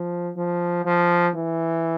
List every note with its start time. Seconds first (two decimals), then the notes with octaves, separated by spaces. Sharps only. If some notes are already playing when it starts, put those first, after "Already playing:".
Already playing: F3
0.37 F3
0.85 F3
1.35 E3